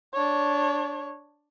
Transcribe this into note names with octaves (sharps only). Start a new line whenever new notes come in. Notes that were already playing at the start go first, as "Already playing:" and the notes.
D4 C#5